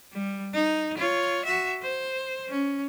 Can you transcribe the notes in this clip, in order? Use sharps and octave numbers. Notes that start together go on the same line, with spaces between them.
G3
D#4
F4 C#5
F#4 E5
C5
C#4